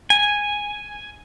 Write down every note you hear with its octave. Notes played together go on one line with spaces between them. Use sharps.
G#5